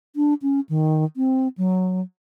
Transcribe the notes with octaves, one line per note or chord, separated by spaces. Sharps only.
D4
C#4
D#3
C4
F#3